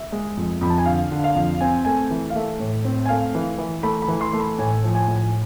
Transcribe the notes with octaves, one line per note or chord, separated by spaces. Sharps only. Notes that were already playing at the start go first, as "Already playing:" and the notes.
Already playing: E5
G#3
F2
F2 B5
A5
G#5
D3 F5
D3
F5
F2
C4 G#5
A3 G#5
E3
F5
A3 E5
A2
C4
G#5
A3 F5
E3
E3
A3 B5
B5
E3
C6
A3
B5
A2 G#5
F3
G#5
A2